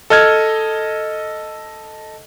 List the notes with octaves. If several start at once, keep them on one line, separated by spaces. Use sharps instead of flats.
A4 D#5 F6 G#6